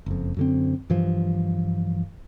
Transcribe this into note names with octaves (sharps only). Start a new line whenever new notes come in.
F#1 F2
F#2 D3 C4
G2 E3 F3